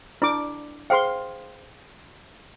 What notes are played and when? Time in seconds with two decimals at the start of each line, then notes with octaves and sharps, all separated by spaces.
0.22 D4 E4 B4 D6
0.90 G#4 C5 F5 G5 C6